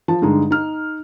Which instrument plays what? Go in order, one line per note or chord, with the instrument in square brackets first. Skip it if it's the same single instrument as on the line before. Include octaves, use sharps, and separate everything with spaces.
[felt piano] F3 A5
G2 D3 G#3 D#4
D#4 F6